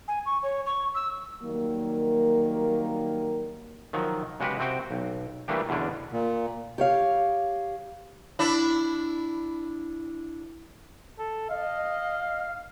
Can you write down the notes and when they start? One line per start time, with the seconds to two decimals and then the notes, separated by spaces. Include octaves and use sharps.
0.08 G#5
0.26 C#6
0.43 C#5
0.66 C#6
0.95 E6
1.42 D#3 F#3 G3 A#3
3.93 D#3 F3 F#3
4.40 C#3 G#3 F#4 G4 B4 F#5
4.59 C3 C4 F#4 G5
4.91 B1
5.48 E3 G3 A3 A#3 D4 G4
5.69 E2 B2 D3 C#4 D4
6.12 A#2
6.78 G4 C#5 F5
8.39 D4 E4
11.19 A4
11.50 D#5 F5